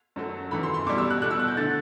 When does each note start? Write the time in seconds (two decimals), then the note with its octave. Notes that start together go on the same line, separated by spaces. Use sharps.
0.16 F#2 F#3 A3
0.51 F#2 E3 A3 B5
0.63 C6
0.74 C6
0.86 B2 D6
0.89 G3
0.98 E6
1.10 F#6
1.22 B2 A3 F#6
1.31 E6
1.39 F#6
1.48 G6
1.57 D3 A3 A6